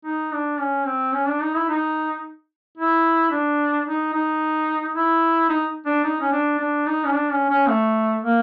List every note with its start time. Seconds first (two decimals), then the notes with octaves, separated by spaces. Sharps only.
0.05 D#4
0.32 D4
0.59 C#4
0.86 C4
1.13 C#4
1.27 D4
1.41 D#4
1.55 E4
1.69 D#4
2.77 E4
3.31 D4
3.87 D#4
4.13 D#4
4.95 E4
5.49 D#4
5.86 D4
6.04 D#4
6.20 C#4
6.32 D4
6.59 D4
6.86 D#4
7.05 C#4
7.13 D4
7.31 C#4
7.49 C#4
7.68 A3
8.22 A#3